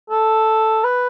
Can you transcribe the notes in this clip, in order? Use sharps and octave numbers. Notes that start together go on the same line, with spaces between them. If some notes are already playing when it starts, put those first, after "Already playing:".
A4
B4